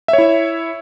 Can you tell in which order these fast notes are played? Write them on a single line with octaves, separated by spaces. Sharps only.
E5 C#5 E4